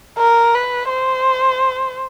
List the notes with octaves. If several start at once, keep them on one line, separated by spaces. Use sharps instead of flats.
A#4
B4
C5